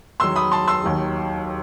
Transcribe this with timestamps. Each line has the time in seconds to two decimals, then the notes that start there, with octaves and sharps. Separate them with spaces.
0.20 E2 D#3 F#3 C6 E6
0.36 B5 D#6
0.52 A5 C6
0.68 C6 E6
0.84 D#2 D#3 F#3